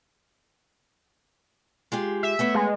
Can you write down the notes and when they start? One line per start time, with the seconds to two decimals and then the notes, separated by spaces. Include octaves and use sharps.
1.92 G#3 F4 G4
2.23 E5
2.39 A3 B3 C#5
2.55 G#3